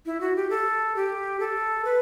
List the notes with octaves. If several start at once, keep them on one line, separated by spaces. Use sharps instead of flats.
E4
F#4
G4
A4
G4
A4
B4